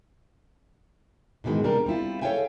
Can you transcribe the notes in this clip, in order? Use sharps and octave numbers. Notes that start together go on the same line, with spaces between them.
G#2 B2 D#3 E3 G#3
C3 G3 D4 A#4
G3 C4 E4 F4
A4 C#5 E5 F5 G5 G#5